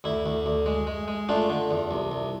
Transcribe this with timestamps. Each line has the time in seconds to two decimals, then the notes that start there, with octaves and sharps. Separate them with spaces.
0.04 D2 E4
0.26 D2
0.46 D2
0.66 G#3
0.87 G#3
1.08 G#3
1.29 A3 D4 F4
1.50 D3
1.71 E2
1.91 C2
2.11 C2